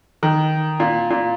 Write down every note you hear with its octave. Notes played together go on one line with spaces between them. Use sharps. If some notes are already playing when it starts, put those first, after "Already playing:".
D#3
A#2
A#2